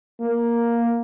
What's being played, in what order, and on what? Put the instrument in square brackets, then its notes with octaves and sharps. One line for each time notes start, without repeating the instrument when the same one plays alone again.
[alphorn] A#3